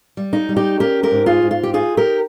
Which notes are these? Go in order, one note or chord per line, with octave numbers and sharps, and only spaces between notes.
G3
D#4
G3
D#4 G4
C#4 G4 A#4
G4 A#4
G#2
F4 G#4
G#2
F4
G4
D#4 F4 G#4
G4 A#4